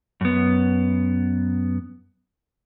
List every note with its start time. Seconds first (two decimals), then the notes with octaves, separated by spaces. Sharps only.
0.21 F#2 B3